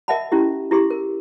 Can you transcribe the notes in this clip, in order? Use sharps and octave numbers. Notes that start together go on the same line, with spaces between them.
A#4 D#5 E5 F#5 A5 B5
C#4 E4 G4
E4 G4 G#4 C6
A#4